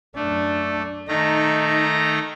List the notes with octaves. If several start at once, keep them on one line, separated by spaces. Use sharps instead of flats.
F#2 A3 D4
D#3 A3 D#4 A#5